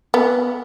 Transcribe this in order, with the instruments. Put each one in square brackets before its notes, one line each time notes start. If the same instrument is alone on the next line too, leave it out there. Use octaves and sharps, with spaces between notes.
[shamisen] B3